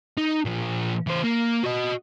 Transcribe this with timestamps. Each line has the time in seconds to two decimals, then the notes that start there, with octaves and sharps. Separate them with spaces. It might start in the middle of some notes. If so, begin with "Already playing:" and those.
0.17 D#4
0.45 A#2 F3
1.07 E3 C5
1.23 A#3
1.63 F#4 D#5